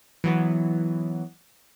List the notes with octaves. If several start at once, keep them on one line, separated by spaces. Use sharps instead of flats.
E3 F#3 B3